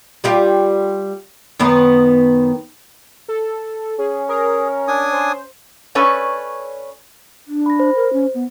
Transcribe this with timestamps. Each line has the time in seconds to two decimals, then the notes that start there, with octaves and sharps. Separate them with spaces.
0.24 G3 F4 G4
1.59 F#2 D#3 B3
3.28 A4
3.99 C#4 G#4
4.29 G#4 A#4
4.88 D4 G#5 D#6
5.13 C5
5.95 C#4 A4 B4 C#5 D5
7.47 D4
7.66 B5 A#6
7.80 C5
7.95 A#4
8.13 C#4
8.34 B3